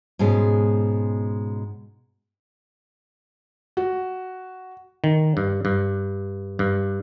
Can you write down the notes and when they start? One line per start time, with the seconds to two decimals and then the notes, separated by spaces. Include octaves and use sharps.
0.19 G#2 B2 G#3 C#4
3.77 F#4
5.04 D#3
5.37 G2
5.65 G2
6.59 G2